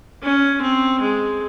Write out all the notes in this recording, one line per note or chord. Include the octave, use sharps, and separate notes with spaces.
C#4
C4
G#3